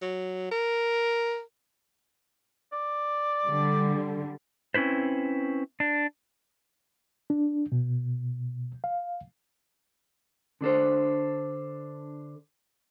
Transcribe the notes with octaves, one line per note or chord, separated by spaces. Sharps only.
F#3
A#4
D5
D3 G3
C4 C#4 E4 B4 C5
D4
D4
B2
F5
D3 D4 A4 C5